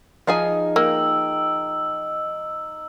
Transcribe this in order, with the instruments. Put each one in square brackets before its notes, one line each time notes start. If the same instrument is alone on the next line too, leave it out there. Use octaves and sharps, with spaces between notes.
[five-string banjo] F3 G#4 G#5 [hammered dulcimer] D#4
[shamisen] A#3 [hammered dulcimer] G5 [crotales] E6